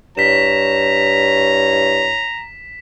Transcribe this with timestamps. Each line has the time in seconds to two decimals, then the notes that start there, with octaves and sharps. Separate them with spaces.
0.17 G2 E4 C#5 A#5 B6 E7